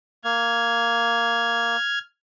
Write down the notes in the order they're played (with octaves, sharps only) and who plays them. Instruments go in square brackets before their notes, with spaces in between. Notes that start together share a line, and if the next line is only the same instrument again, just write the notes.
[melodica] A#3 [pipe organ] F6 G#6